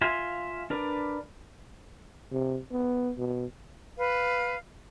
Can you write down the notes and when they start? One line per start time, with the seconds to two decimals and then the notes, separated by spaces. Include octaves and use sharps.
0.01 F4 E5 F5 G#5 C6
0.70 D4 A#4 B4 D5
2.32 C3
2.71 B3
3.18 B2
3.98 B4 F5